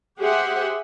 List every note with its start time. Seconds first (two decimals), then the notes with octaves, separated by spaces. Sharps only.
0.19 G4 G#4 C5 E5 F#5